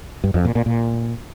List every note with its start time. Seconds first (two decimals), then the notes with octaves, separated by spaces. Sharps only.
0.24 G2
0.34 F2
0.45 A#2
0.55 A#2
0.66 A#2